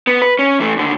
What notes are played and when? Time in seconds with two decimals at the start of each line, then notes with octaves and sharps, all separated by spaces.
0.07 B3
0.22 B4
0.39 C#4
0.60 E3 A3
0.77 D#2 D3